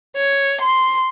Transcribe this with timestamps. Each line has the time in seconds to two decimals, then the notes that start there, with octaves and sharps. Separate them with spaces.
0.16 C#5
0.61 C6